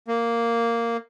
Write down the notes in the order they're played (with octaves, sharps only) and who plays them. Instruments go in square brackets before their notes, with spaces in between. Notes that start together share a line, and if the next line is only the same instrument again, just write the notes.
[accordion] A#3